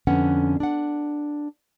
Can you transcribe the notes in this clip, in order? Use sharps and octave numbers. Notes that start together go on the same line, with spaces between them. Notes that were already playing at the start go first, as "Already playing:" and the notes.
F2 D3 B3 C#4 F#5
D4 F#5